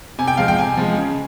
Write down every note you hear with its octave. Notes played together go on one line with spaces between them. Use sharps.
C3 G#5
G5
F3 G#3 F5
G5
C3 G#5
F3 G#3
C#3